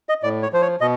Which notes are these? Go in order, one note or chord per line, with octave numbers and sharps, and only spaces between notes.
D#5
A2 D5
C#5
F3 C5
C#5
B2 D#5